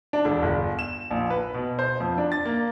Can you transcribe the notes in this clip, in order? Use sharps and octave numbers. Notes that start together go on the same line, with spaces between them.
D4
E1
G1
E7
A#1
B4
B2
C5
F2
D4
A6
A#3